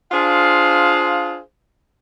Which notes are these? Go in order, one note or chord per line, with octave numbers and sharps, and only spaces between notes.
D4 F4 G#4 C5 F5